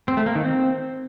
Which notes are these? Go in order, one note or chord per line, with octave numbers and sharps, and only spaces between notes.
C4
A3
A#3
D#3
C4